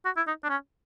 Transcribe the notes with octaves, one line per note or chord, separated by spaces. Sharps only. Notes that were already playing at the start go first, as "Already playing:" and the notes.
F#4
E4
D#4
D4
C#4